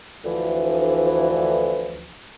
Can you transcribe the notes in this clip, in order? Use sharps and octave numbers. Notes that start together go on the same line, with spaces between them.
D2 E3 F3